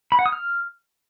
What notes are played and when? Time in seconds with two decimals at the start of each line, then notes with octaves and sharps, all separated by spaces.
0.12 B5
0.19 F#5
0.26 D#6
0.32 F6